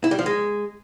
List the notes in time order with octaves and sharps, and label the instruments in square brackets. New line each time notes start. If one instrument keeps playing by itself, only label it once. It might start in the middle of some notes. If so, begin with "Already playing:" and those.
[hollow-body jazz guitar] E4
G3
F3
G#3